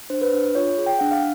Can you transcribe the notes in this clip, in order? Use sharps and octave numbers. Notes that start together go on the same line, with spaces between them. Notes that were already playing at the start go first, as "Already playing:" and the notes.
D4 C5
B4
D4
F4 C#5
G#4
G5
D4 F#5
F5